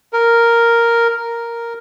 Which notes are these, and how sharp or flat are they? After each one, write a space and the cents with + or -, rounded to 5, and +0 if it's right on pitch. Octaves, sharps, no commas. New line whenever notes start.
A#4 +0
A#4 +0